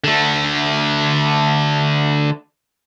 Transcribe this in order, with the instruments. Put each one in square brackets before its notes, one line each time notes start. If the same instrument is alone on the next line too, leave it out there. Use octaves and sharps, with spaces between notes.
[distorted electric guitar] D3 A3